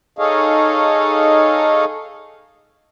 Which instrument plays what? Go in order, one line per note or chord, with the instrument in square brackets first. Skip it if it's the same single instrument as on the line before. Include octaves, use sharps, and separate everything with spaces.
[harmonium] D#4 G#4 A4 C#5 D#5 F5